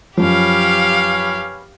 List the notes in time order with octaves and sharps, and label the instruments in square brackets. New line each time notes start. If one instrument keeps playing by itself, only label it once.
[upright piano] F#2 F3 [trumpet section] C#4 B4 B5 [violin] G4 F5